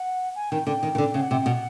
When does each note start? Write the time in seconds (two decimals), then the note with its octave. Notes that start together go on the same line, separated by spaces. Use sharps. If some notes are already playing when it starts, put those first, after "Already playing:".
Already playing: F#5
0.35 G#5
0.51 D#3 G5
0.67 D3 G5
0.83 D#3
0.95 D#3
0.98 D3
1.14 C#3
1.21 F#5
1.31 C3 G5
1.46 B2 F#5